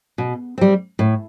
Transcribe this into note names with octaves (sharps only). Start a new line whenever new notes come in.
B2
G3 C4
A2